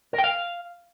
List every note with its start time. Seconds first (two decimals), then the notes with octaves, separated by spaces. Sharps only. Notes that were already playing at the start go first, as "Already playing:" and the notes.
0.13 A#4
0.18 G5
0.24 F5